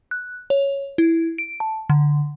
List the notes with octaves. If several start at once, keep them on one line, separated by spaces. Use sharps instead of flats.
F#6
C#5
E4
D7
A5
D3